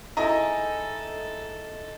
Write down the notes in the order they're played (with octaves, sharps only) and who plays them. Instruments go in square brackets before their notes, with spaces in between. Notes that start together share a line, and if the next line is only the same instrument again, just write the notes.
[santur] G#3 D#4 [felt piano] E4 D#5 A#5 [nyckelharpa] A4